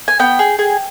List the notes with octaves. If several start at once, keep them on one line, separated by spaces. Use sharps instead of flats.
G#5
B3 G5
G#4
G#4